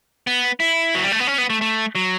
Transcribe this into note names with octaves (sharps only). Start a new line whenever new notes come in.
B3
E4
F#3
G3
A3
B3
C#4
B3
A3
A3
F#3